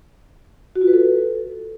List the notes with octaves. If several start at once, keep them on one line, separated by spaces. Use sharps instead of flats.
F#4
F4
B4
A4